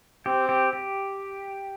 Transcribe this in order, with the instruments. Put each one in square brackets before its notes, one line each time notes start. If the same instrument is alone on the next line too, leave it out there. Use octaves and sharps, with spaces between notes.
[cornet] C4 [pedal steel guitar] G4
[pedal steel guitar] G4
G4